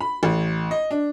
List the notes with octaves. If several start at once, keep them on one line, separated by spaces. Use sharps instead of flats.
B5
A1
D#5
D4